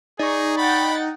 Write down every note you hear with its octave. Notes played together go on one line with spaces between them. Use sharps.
D#4 G#4 D5 C#6
F#5 G5 B5 A6